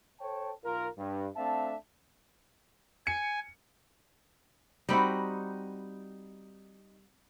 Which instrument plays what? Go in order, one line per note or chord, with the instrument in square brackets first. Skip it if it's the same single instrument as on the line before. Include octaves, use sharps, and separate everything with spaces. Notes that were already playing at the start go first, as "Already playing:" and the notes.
[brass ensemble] A4 C5 C#5 G5 A5
B1 F4 A#4
G2
A3 C4 D4 E5 F5 A5
[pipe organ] G#5 [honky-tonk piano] C#7
[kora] G3 C4 F#4 [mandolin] D#4 B5